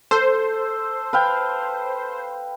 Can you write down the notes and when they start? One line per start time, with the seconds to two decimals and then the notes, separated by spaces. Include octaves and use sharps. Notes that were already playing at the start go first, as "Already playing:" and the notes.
0.11 A4 C5
1.13 B4 F5 G5